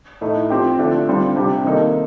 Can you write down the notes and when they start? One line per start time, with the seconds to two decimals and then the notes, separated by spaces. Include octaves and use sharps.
0.21 A2 A3 D#4
0.50 F3 C4 G4
0.78 D3 F3 A3 D4 A4
1.07 D3 G3 C4 F4
1.36 C3 G3 D4 G4
1.64 C3 D#3 A#3 D#4 A4